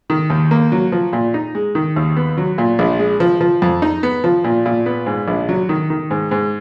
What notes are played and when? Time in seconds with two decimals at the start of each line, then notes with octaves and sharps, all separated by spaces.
0.10 D#3
0.30 D#2
0.51 A#3
0.72 F#3
0.92 F3
1.13 A#2
1.34 D#4
1.55 G#3
1.75 D#3
1.96 D#2
2.16 B3
2.37 F#3
2.58 A#2
2.79 A#1
2.99 G#3
3.20 F3
3.41 F3
3.62 F2
3.82 D#4
4.03 B3
4.24 F3
4.44 A#2
4.66 A#2
4.86 B3
5.06 G#2
5.28 A#1
5.49 F#3
5.69 D#3
5.90 D#3
6.11 G#2
6.31 G#2